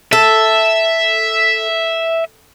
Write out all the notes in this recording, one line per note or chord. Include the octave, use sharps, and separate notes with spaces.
A4 E5